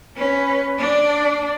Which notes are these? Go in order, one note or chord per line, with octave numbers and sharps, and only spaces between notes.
C#4 B4
D4 D5